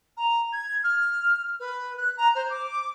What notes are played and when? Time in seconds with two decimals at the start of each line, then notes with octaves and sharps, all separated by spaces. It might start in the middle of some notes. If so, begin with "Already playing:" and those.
0.17 A#5
0.52 G#6
0.83 F6
1.59 B4
1.97 F#6
2.17 A#5
2.35 C5
2.49 D6